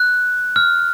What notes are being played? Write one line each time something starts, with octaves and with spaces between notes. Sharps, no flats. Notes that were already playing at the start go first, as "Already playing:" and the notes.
Already playing: F#6
F6